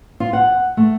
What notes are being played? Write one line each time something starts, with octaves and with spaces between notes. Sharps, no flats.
F4
F#5
A3